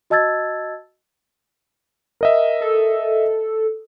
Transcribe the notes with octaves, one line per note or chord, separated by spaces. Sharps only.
F#4 D#5 A5 E6 G#6 A6
A#4 D#5 E5
A4